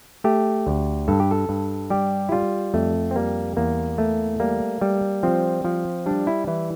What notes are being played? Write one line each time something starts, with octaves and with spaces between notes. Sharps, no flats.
A3 G4
D2
G2 A4
G4
A4
G2
G3 G4
E4
G3 F4
F2 A3
C4
G3 A#3
E2 A#3
A3
G3 A#3
G3
F3 C4
F3
G3 D4
E4
E3 E4